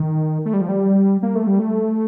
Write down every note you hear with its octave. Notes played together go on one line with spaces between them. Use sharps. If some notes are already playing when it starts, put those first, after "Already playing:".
Already playing: D#3
A3
G3
F3
G3
A#3
A3
G3
A3